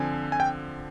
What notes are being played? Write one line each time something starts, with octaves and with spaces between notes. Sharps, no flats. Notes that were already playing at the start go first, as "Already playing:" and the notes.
Already playing: D3 F3 C4 G#5
G#5
G5